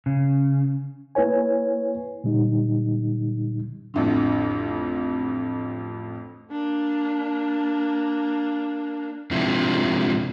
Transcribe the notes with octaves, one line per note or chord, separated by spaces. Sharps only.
C#3
A#3 E4 B4 C#5 G#5
A#2 D3 G3 D#4
A1 F2 D3
A#3 D4
G#2 C3 F3 D4 E4